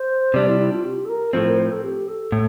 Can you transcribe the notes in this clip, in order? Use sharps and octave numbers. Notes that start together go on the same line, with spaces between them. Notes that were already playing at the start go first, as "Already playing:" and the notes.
Already playing: C5
C3 G3 D4 D5
E4
E4
F4
G4
A4
A#4
A2 F3 C4 A4
A#4
C5
A4
G4
A4
A2